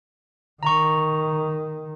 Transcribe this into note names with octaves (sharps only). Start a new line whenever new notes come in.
D#3 A#5 C#6